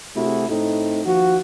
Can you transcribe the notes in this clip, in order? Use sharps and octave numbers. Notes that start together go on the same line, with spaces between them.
C3 A3 E4 F#4 G#4
A2 A3 C4 D#4
D#2 F3 F#4